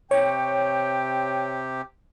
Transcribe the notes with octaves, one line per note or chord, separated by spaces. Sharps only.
C3 G4 C#5 G5